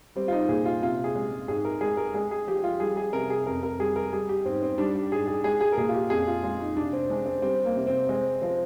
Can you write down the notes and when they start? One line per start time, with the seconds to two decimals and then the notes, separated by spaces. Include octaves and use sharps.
0.16 G3 C4
0.28 F4
0.33 D#4
0.49 A#2 G#4
0.65 F4
0.82 C3 F4
1.04 G#4
1.15 G#3
1.48 G#2 G#4
1.65 A#4
1.81 G#3 G#4
1.97 A#4
2.14 G#3 G#4
2.31 G#4
2.47 F3 G4
2.64 F4
2.80 G3 G#4
2.97 G#4
3.13 C3 A#4
3.30 G#4
3.46 F2 A#4
3.63 A#4
3.79 G3 G#4
3.96 A#4
4.12 G3 G#4
4.29 G4
4.45 G#2 C4
4.63 C4
4.78 G3 D4
4.95 G4
5.12 G#2 G#4
5.27 G#4
5.44 G#3 G#4
5.61 G#4
5.72 A#4
5.77 A#2 G#4
5.89 F4
5.94 G4
6.10 F2 G#4
6.27 F4
6.43 G#3 F4
6.60 D#4
6.77 C3 D4
6.93 C4
7.10 G#3 D4
7.26 C4
7.42 G3 C4
7.65 A#3
7.76 C3
7.87 C4
8.09 G#3 C4
8.42 F3 C4